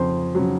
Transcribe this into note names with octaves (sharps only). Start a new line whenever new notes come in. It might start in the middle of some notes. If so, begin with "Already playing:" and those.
Already playing: F2 C#3 C5
C#3 F#3